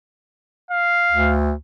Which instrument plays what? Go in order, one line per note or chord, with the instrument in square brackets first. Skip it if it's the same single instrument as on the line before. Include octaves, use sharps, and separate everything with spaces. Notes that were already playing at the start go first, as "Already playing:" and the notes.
[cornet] F5
[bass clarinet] D2